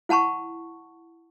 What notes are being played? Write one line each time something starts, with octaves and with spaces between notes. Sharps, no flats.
E4 F#5 A5 B5 C#6